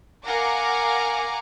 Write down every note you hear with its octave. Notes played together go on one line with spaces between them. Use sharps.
A#4 F5 F#5 G#5 A#5 D6